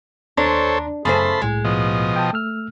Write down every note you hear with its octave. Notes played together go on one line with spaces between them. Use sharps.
D#2 D4 A4 C5 C#5 A#5 C6
F#2 C#3 A3 C5 A5 B5 C6
C2 A2 G#3
B2 F3 D#5
G5 A5
A3 E6 F6